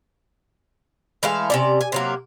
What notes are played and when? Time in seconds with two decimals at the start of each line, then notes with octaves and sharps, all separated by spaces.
1.23 E3 G#3 A3 F5
1.50 C3 C#4 D5
1.81 G#5
1.92 C3 F#3 A#3